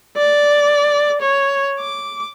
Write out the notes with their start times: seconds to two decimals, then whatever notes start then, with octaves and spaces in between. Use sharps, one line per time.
0.17 D5
1.21 C#5
1.79 D6